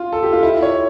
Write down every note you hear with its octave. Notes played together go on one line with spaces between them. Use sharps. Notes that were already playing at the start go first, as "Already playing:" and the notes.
Already playing: F4
A4
G4
F4
E4
C#5